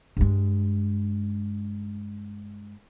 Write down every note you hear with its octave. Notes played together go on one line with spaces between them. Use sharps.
G2 G#3